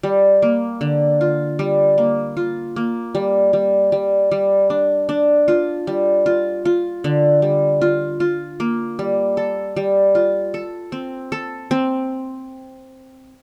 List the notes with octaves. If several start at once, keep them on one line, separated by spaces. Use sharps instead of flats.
G3
A#3
D3
F4
G3
A#3
F4
A#3
G3
G3
G3
G3
D4
D4
F4
G3
F4
F4
D3
G3
F4
F4
A#3
G3
A4
G3
F4
A4
C4
A4
C4